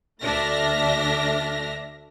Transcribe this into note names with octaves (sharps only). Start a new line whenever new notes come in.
D2 A3 D4 E5 F6 A#6